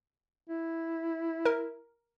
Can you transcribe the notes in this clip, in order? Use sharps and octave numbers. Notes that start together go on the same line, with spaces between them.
E4
A#4